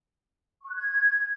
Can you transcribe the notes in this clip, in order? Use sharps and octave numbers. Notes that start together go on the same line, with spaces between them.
C#6
F#6
G#6